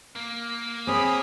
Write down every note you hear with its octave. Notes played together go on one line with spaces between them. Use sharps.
A#3
C4 G#4 C#5 B5 D#6